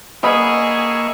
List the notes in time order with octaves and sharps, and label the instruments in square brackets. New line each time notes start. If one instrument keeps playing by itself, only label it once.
[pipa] C#3 B3 B5 [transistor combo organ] A#3 E5 C#6 [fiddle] G#4 [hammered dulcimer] D#5